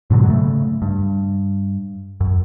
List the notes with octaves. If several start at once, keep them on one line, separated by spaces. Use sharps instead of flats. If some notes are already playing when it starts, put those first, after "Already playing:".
G#2 B2 D3 F#3
C#3 G#3 A3
G2
F#2